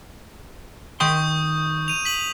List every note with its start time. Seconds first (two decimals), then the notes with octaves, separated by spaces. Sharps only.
1.00 D#3 G5 C6 C#6 D#6 G6
1.88 D#7 F7
2.05 B6 F#7